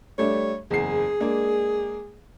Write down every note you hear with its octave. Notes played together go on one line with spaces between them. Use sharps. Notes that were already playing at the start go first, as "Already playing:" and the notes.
G3 A3 D4 C#5
F#1 E2 G#4 C7
G#3 A#3 D4